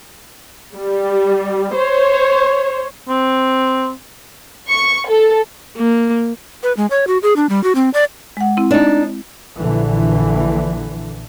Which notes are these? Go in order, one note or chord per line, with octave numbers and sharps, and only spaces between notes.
G3
C5 C#5
C4
C#6
A4
A#3
B4
G#3
C#5
F#4
G#4
D4
G3
F#4
C4
D5
G#3 F#5
C4 E4
D4 D#4
A#1 D3 E3